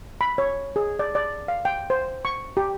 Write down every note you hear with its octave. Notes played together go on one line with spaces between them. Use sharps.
B5
C#5
G#4
D5
D5
F5
G5
C5
C#6
G4